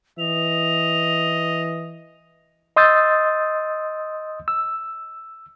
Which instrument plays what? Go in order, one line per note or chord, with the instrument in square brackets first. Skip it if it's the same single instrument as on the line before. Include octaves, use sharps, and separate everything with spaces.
[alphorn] E3 [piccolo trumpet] D#5 [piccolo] F7
[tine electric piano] D#5 C6 D#6 E6 G6 A6
E6